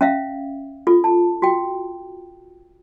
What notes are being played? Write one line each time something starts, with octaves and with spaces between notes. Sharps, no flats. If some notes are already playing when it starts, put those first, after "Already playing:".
C#4 E5 F5
F4 A4
A5
F#4 G5